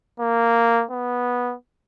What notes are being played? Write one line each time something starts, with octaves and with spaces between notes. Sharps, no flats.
A#3
B3